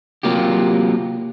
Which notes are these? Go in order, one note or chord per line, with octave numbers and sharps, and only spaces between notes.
C3 F#3 A#3 F4 G4